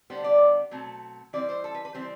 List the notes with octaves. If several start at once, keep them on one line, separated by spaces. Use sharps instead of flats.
D3 G3 B3 C5
D5
B2 F#3 A3 C4
E3 G3 C4 D5
C5
A4
B4
B4
E3 G3 C4 C5